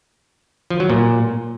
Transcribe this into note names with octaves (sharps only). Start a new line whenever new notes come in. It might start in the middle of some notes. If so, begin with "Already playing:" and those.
F3
F#3
A#2